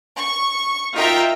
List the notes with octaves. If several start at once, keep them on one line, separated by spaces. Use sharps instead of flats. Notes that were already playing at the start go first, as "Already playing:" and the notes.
C#6
D#4 F4 A#4 E5 G5 A#5